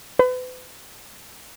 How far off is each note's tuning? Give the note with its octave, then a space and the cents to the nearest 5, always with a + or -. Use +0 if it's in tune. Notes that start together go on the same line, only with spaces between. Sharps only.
B4 +40